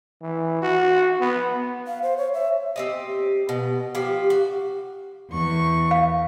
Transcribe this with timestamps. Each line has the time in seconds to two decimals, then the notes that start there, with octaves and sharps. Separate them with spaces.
0.22 E3
0.62 F#4
1.21 B3
1.87 F5
2.03 C5
2.18 C#5
2.34 E5
2.76 C4 G4 D#5
3.49 B2
3.95 F3 G4
4.30 F#4
5.30 E2 C#6
5.91 F5